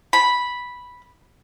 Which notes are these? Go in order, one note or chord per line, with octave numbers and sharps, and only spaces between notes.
B5